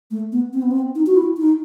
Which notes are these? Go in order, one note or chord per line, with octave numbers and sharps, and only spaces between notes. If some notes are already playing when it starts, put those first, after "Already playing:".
A3
B3
C4
B3
C4
D#4
F#4
E4
D#4